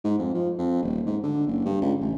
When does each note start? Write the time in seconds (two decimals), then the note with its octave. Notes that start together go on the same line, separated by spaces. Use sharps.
0.04 G#2
0.19 F2
0.34 F3
0.58 F2
0.82 D#1
1.06 G#2
1.23 D3
1.47 F#1
1.65 G2
1.82 C#2
2.01 A1